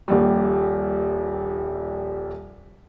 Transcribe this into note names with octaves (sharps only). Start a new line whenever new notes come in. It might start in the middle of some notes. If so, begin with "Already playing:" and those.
D#1 A#1 G3